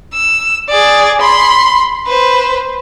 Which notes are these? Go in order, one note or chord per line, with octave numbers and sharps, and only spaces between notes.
E6
G#4 D5
B5 C6
B4 C5